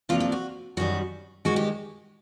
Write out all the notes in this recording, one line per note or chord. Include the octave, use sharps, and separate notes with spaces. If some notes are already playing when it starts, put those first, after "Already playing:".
C3 F3 A#3 D4 F4
F4
F#4
F#2 D#3 G3 F#4
G2 D#3 G#3 F#4
G4